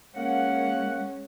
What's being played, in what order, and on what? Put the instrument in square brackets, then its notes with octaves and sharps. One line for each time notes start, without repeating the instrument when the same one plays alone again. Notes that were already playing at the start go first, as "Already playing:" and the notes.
[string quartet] G#3 C#4 [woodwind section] A#3 F#5